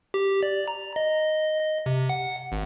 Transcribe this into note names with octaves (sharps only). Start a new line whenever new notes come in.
G4
D5
A#5
D#5
D#5
C3
F#5
G#1